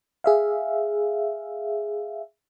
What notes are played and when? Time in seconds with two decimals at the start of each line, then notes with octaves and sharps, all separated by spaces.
0.24 G#4 E5 F5